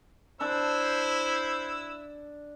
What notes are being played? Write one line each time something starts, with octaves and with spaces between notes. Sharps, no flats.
D4 E4 C5 E6